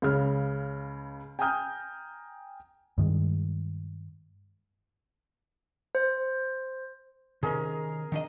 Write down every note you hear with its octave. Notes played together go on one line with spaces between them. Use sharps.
C#2 C#3 F6
G5 G#5 A#5 D#6 F6 G6
G2 D#3 G#3
C5
C3 D#3 C#4 G#4 A#4
D#3 D4 D#5